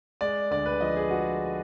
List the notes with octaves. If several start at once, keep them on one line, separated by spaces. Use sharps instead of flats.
G#3 D5
D2 D5
B4
F3 D#5
G#4
F#4